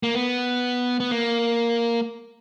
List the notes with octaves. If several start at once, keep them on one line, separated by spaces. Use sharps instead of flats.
A#3
B3
B3
A#3